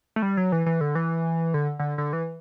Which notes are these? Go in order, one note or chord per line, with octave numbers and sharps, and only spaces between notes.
A3
G3
F#3
E3
E3
D3
E3
D3
D3
D3
E3